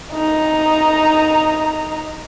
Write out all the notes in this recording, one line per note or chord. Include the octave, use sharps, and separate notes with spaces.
D#4 A#5